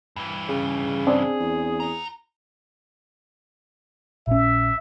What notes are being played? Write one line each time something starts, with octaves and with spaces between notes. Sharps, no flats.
G2 E3
C#3 G#4
C4 D4 G#4
E2
E4 A#5
A#1 C#4 E5